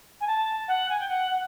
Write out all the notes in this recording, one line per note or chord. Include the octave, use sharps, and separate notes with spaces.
G#5
A5
F#5
G#5
G5
F#5
F#5